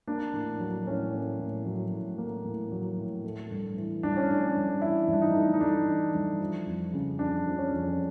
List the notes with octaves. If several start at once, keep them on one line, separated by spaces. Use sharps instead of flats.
A#3 D4
A2
F#3
A2 C#4
A#3
A2
F#3
A2
A#3
A2
F#3
A2
A3
G2
E3
G2 D4
C#4
A3 D4
G2
E3 E4
G2
D4
D#4
A3
D#4
G2 D4
E3
G2
F3
F2
C#3
F2 D4
F3
C#4
F2